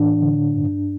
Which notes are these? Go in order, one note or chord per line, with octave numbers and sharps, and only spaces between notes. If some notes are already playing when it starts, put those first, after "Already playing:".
Already playing: A2 E3 D4
D3
G2